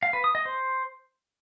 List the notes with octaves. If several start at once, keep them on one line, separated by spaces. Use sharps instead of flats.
F5
B4
D#6
D#5
C5